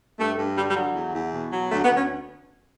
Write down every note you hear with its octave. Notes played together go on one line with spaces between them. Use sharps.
G2 A3
G2
D3 G3
G3
F#3
E2
E2
B2
F#3
D2 A3
B3
D2
C#4